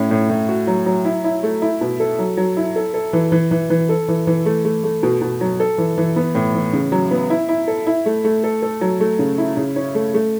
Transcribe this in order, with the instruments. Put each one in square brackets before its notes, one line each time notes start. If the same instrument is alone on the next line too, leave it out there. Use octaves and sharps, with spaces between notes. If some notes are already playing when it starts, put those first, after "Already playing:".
Already playing: [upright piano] A2 C#4
A2
A2
F#4
F#3
F#3
E4
E4
A3
E4
B2
A4
F#3
F#3
E4
A4
A4
E3
E3
E3
E3
A4
E3
E3
A3
A3
A3
B2
B2
F#3
A4
E3
E3
B3
A2
E3
C#3
F#3
B3
E4
E4
A4
E4
A3
A3
A4
A4
F#3
A3
C#3
E4
C#3
C#4
A3
A3